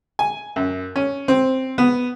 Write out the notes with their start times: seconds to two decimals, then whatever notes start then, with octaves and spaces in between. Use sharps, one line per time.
0.19 G#5
0.56 F#2
0.96 C#4
1.28 C4
1.78 B3